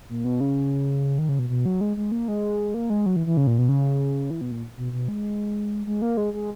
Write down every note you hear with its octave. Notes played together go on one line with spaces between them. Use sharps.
A#2
B2
C#3
D#3
C#3
B2
B2
F#3
G#3
G#3
A#3
G#3
A#3
G#3
F#3
E3
E3
C#3
A#2
B2
C#3
E3
B2
A#2
B2
B2
G#3
G#3
A#3
G#3
G#3